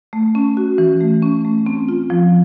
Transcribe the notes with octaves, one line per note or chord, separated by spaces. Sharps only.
A3
C#4
F#4
E3
A3
C#4
A3
C4
F4
F3